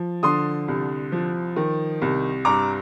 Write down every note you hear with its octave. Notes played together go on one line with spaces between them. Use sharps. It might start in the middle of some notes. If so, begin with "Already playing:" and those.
Already playing: F3
D3 C6 D#6
C2
F3
D#3
C2
G2 A#5 D6